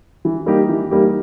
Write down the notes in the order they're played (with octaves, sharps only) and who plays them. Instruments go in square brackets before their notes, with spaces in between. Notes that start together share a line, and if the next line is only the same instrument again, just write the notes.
[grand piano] E3
G3 A#3 D#4 G4
E3
G3 A#3 D#4 G4